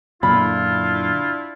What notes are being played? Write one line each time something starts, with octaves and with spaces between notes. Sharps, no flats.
F#2 A#2 D3 D4 E4 F4 B5